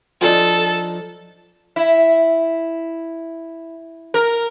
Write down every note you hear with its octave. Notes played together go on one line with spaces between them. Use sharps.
F3 D4 D#4 A4
E4
A#4